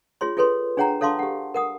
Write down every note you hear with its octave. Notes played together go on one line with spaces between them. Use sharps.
F4 G#4 C#5 C6
F4 G#4 A4 B4 C#5 C6
D4 G#4 C#5 F#5 G5 A#5
A4 C#5 F5 A5 C6 D6
G4 F#5
A#4 F#5 D#6